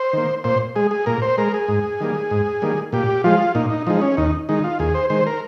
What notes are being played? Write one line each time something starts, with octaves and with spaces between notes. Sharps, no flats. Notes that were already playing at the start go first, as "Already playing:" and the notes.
Already playing: C5
D#3 A#3
A#2 C5
G#3 G#4
G#4
A#2 A#4
C5
G#3 A#4
G#4
G#2
D#3 G3 A#3
G#2
D#3 G3 A#3
A#2 G4
F3 G#3 F4
A#2 D#4
D#4
F3 G#3 D#4
C#4
D#2 D#4
D#3 G#3 D#4
F4
D#2 G#4
C5
D#3 G#3 C5
A#4